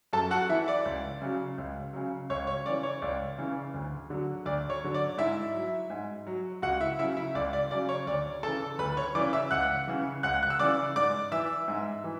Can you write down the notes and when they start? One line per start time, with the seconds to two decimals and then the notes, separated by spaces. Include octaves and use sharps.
0.13 F#2 A4 A5
0.31 F#4 F#5
0.49 E3 E4 E5
0.68 D5
0.85 C#2
1.22 C#3 F#3
1.58 C#2
1.93 C#3 F#3
2.30 C#2 C#5
2.47 C#5
2.65 C#3 D5
2.69 E3
2.83 C#5
3.02 C#2 D5
3.38 C#3 E3
3.74 D2
4.10 D3 F#3
4.46 D2 D5
4.70 C#5
4.83 D3 F#3
4.94 D5
5.18 G#2 E4 E5
5.55 F#3
5.90 G#2
6.27 F#3
6.62 C#2 F#4 F#5
6.81 E4 E5
6.99 C#3 F#3 E4 E5
7.17 E4 E5
7.35 C#2 D5
7.53 D5
7.71 C#3 F#3 D5
7.89 C#5
8.07 D2 D5
8.43 C#3 E3 A4 A5
8.79 D2 B4 B5
8.97 C#5 C#6
9.15 C#3 E3 D5 D6
9.33 E5 E6
9.51 C#2 F#5 F#6
9.87 C#3 E3
10.23 C#2 F#5 F#6
10.43 F#6
10.50 E6
10.59 C#3 E3 D5 D6
10.96 G#2 D5 D6
11.32 E3 E5 E6
11.68 G#2
12.04 E3